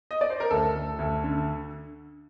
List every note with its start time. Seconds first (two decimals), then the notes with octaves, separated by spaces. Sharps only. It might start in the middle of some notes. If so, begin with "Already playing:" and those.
0.11 D#5
0.21 D5
0.30 C5
0.40 A#4
0.51 D2 A4
0.75 D2
0.99 D2
1.24 D3